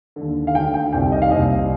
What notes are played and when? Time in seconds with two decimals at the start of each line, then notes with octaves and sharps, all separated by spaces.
0.16 D#2 D3
0.47 F5
0.54 D2 D3 G5
0.74 G5
0.93 C2 C3 D#3 G5
1.12 D#5
1.22 F5
1.31 C2 A#2 D#5